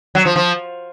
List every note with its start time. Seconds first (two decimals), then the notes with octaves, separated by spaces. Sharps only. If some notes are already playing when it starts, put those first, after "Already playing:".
0.15 F#3
0.25 F3
0.36 F3